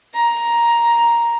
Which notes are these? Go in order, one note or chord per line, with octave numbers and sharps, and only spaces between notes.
A#5